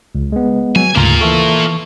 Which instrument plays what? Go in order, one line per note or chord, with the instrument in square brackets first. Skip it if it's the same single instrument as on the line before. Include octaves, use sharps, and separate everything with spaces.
[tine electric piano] C#2
G#3 B3
[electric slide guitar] F#3 [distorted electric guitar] G#5
[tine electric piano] D2 G#2 [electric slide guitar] C#3 A5 A#5 [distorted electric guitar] A#3 F4
[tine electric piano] E3 A5 C#6 [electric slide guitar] A4 E5